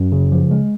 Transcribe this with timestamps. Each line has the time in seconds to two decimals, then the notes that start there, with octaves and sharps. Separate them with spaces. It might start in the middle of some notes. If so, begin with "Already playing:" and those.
Already playing: F#2
0.12 C#3
0.32 F3
0.51 G#3